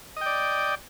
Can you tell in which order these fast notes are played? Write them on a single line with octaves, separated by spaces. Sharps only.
D#5 G5 D5